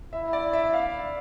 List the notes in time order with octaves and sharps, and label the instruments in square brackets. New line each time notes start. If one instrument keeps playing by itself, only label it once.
[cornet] E4 [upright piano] E5
[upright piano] D5
E5
F5